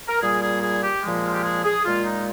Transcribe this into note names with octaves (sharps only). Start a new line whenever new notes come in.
A#4
A#2 G3 G#4
G#4
G#4
G4
A#2 F3 G#3
F4
G4
G#4
G#4
A#2 G#3 F4
D#4